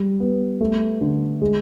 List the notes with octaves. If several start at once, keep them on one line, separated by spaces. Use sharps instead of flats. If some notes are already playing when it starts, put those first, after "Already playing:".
Already playing: G3
B3
A3
D3
G#3